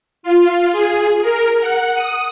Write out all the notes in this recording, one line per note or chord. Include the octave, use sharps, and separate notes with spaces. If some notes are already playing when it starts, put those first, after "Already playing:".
F4
G#4
A#4
F#5
D#6